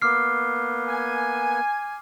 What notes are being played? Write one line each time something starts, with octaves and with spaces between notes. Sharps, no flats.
A#3 B3 D6 F6 C7
G#5